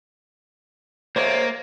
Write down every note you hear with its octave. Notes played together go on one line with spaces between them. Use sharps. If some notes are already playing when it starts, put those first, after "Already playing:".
A#3 C5 C#5 D#5